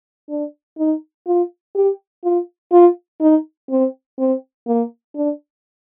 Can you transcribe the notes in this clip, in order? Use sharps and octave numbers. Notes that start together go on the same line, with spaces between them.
D4
D#4
F4
G4
F4
F4
D#4
C4
C4
A#3
D4